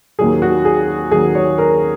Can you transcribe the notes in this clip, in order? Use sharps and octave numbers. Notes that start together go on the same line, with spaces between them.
D#2 D#3 F#3 G#4
F#4
G#4
D#2 D#3 F#3 G#4
C#5
A#4